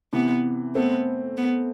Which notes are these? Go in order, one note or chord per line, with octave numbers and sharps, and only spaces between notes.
C3 E3 B3
A3 B3 C4
B3